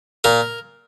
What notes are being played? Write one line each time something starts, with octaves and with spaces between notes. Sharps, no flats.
A#2 A#4